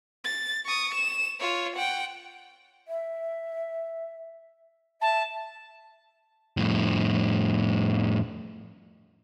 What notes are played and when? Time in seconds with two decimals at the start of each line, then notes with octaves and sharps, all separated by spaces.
0.24 A6
0.66 C#6 D#6
0.95 E7
1.40 F4 C#5
1.76 F#5 G5
2.88 E5
5.02 E5 A5
6.57 F2 A2